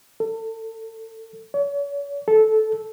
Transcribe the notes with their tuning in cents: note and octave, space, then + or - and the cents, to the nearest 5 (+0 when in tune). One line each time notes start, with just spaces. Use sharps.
A4 +30
C#5 +40
A4 -15